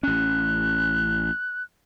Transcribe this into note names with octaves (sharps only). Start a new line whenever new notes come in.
A1 C#4 F#6